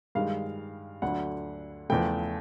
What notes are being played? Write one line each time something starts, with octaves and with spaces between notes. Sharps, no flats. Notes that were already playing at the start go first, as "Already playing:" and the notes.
G2 D#3 G#3 F5
D2 D3 F#3 F#5
E2 C#3 F3 A3 G5